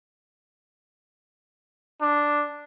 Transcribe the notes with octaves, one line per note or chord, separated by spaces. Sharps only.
D4